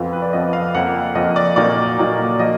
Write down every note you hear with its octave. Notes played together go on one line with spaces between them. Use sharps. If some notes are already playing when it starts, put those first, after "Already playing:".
Already playing: F2 F3 B3 F4
B4
D5
F2 F3 B3 F4 D#5
F5
F2 F3 A#3 F#5
F2 F3 A#3 D#5
D5
A#2 F#3 A#3 D#4 D5
A#2 F#3 A#3 D#4
F3 A#3 F4 D#5